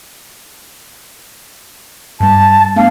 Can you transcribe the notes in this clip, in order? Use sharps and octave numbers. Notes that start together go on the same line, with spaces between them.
G2 G3 A5
A3 B3 D4 F5